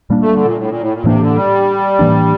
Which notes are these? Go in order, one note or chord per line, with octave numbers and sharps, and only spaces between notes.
A#2 G3 A#3 D4
A3
D3
A#2
A2
A#2
A2
A#2
A2 C3 E3 A#3 D4
D3
G3
A2 E3 A#3 D4